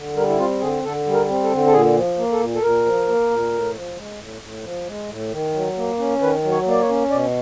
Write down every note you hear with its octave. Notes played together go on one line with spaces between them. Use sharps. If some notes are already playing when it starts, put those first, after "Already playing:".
Already playing: D3
G3 A#4
E4
C4 F4
D3 G#4
D3 A4
G3
A#4
C4
A4
D3
A4
A#2 G#4
F3
A#3
A4
A#2
A4
A#2 A#4
F3
A#3
A#2
A2
F3
G#3
A2
A2
F3
G#3
A2
D#3
F#3
A#3
C#4
D#3 B4
F#3
C#5
A#3 D5
C#5
C#4
B2 D5